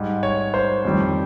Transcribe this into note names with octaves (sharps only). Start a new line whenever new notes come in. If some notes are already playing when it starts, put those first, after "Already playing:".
Already playing: G#2 G3
C#5
C5
F2 D#3 G3